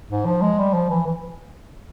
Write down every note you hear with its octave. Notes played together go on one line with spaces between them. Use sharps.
G#2
F3
G#3
G3
F3
E3
E3